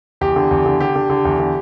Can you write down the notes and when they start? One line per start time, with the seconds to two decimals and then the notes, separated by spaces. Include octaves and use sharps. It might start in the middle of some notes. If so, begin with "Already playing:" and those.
0.21 E2 G4
0.36 D3
0.51 E2
0.66 D3
0.80 D3 G4
0.96 D3
1.10 D3
1.25 E2
1.40 D3